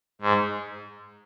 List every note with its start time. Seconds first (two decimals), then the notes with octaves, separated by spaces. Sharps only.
0.21 G#2